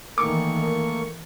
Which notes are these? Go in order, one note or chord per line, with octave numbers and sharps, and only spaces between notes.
D#3 E3 A3 A#3 C#6 D6